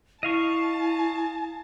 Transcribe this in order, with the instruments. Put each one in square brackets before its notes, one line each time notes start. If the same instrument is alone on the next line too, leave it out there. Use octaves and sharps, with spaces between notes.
[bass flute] E4 [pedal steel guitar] D#5 F5 C#6 [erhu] A5